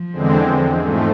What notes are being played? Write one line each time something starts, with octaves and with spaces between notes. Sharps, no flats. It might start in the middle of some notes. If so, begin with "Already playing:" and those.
Already playing: F3
E2 D3 G#3 C4
G#2 F3 G#3 A3